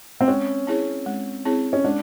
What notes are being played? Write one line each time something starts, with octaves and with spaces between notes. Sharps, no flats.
C4
G#3 C#4
C4 E4 G#4 C#5
G#3
C4 E4 G#4 C#5
C#4
G#3 D4